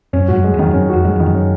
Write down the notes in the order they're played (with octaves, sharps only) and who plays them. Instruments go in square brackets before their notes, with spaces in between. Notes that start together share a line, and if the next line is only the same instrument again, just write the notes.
[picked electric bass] F#2 [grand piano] C#4
[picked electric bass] G#2 [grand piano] F#4
[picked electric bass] F#2
[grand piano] G#3
[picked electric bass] F2
[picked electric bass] F#2 [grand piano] D#3
[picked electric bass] F2
[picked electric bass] F#2 [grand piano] C#4
[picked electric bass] F2 [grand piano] F#4
[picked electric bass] F#2 [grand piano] G#3
[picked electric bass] F2 [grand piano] D#3
[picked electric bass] F#2
[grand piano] C#4